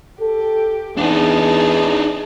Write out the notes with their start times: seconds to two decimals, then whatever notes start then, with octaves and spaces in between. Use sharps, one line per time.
0.21 G4 A4
0.97 E2 D4 D#4 G#4 A5